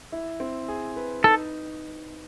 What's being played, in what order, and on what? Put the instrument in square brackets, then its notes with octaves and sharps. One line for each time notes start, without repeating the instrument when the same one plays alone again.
[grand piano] E4
C4
G#4
B4
[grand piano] D#4 [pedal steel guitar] A4